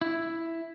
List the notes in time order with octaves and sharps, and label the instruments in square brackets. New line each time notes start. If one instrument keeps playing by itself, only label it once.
[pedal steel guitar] E4